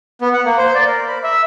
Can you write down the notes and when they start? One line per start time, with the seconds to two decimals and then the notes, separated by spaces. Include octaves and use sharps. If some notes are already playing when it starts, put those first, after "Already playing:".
0.21 B3
0.33 F#5
0.45 A#3
0.58 C5
0.75 D5
0.87 A#4
1.08 B5
1.24 E5